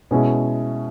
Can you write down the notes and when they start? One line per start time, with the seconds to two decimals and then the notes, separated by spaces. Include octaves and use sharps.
0.11 B2 G#3 C#4 E4